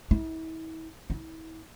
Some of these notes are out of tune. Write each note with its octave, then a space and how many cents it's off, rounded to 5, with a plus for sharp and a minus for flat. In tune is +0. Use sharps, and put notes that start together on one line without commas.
E4 -40
E4 -40